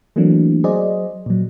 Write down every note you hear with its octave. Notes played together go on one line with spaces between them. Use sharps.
E3 F#3 A3 A#3 C4 D4
F#3 G#4 C5 D5 D#5
A#2 F#3